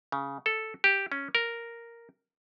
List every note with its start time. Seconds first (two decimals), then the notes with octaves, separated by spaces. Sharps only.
0.12 C#3
0.46 A4
0.84 G4
1.12 C#4
1.35 A#4